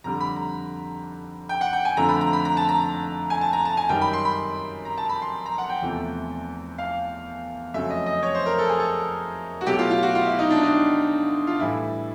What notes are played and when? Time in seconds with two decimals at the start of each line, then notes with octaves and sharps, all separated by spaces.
0.04 F2 D3 G3 A#5
0.21 B5
0.36 A#5
1.49 G5
1.61 F#5
1.73 G5
1.85 G#5
1.97 F2 D3 F3 A3 A#5
2.09 B5
2.21 A#5
2.33 B5
2.45 A#5
2.57 A5
2.69 A#5
3.30 G#5
3.41 A5
3.53 A#5
3.65 A5
3.77 G#5
3.89 F#2 D#3 G3 G5
4.02 B5
4.13 C6
4.25 B5
4.85 A#5
4.98 A5
5.09 B5
5.22 C6
5.46 A#5
5.58 F#5
5.69 G5
5.82 E2 C3 F3 A3
6.78 F5
7.74 F2 C#3 F#3 A3 E5
7.90 D#5
8.06 D#5
8.23 C#5
8.35 C5
8.46 A#4
8.59 A4
8.69 G#4
8.80 A4
9.61 F#4
9.66 B2 F#3 A3 G4
9.79 F4
9.91 F4
10.03 F#4
10.15 F4
10.26 E4
10.39 D#4
10.50 D4
10.63 D#4
11.47 F4
11.59 A2 E3 G3 E4